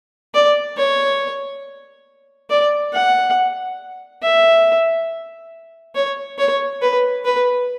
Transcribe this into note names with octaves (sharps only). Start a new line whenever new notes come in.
D5
C#5
D5
F#5
E5
C#5
C#5
B4
B4